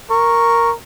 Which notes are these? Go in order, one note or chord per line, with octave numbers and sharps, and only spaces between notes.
A#4 C#6